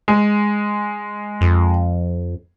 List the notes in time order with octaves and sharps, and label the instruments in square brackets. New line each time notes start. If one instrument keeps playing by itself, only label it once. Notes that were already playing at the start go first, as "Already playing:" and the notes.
[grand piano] G#3
[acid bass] F2